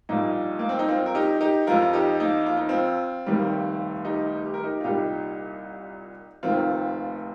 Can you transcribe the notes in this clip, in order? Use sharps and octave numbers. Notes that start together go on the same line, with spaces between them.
A#1 A#2 G3 A#3 D#4
A#3
C4
D#4
C4 F4
A#4
D#4 G4
D#4 G4
F2 F3 F4 A#4
F4
D#4 G4
A#3 D#4
F4
D#4
C4 F4
F1 D#2 D#3 G3
D#4 G4
G4
A#4
D#4 G4
F4
C2 A#2 G3 D#4 G4
F1 D#2 D#3 C4 F4